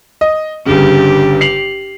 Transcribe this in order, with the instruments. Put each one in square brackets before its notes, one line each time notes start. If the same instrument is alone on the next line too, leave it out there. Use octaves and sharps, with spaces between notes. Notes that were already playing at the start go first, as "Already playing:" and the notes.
[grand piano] D#5
[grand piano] G1 G2 C#3 [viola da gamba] G4
[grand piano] C7 F7 F#7